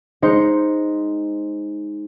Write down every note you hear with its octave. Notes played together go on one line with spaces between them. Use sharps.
G#3 D#4 C5 C#7